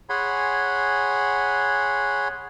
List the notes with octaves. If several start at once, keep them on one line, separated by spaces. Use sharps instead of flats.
G#4 C#5 F#5 G#5 B5 C6